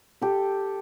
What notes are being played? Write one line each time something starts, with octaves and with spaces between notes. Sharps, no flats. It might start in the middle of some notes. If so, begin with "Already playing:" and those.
G4 A4